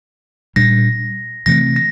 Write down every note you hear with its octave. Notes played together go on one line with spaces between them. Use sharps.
A#2 G3 D4 A#6
C3 E3 A3 C4 A#6
A#6